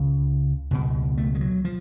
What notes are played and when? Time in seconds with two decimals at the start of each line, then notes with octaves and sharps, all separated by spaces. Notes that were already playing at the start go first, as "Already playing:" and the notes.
Already playing: C#2 C#3
0.71 C#2 B2
1.18 A3
1.35 G#3
1.41 F#3
1.65 F3